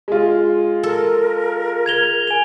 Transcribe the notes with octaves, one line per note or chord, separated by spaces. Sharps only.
G#3 F4
A4 A#4
G#6 F7 G7
G#5 F7